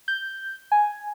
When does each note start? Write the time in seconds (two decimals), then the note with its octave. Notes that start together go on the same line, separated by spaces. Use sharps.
0.08 G6
0.72 G#5